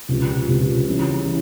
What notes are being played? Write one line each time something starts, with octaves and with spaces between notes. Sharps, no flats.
C#2 C3 F3
C#2 C3 F3
C#3 E3 G3
C#3 E3